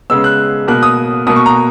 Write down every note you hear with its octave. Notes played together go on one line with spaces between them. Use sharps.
C#3 G#3 B3 E6
F#6
B2 A#3 F#6
D#6
B2 A#3 D#6
C#6
A#5